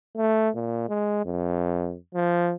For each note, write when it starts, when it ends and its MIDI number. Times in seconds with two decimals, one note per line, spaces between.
0.17 0.49 57
0.55 0.88 46
0.89 1.23 56
1.25 1.96 41
2.14 2.54 53